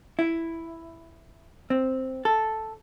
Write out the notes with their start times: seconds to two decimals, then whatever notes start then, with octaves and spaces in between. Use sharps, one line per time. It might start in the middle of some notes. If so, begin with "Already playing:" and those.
0.19 E4
1.70 C4
2.25 A4